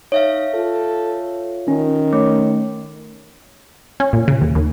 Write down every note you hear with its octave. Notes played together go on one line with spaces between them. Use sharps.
D#4 C#5 E5 F5
F4 A4
D#3 C#4
A3 C#5
C#4
A#2
C#3
D#2
D#2